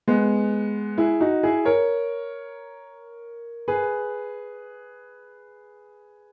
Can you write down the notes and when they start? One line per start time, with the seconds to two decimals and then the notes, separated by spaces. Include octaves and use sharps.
0.08 G#3 B3
0.98 E4 G#4
1.21 D#4 F#4
1.43 E4 G#4
1.65 A#4 C#5
3.68 G#4 B4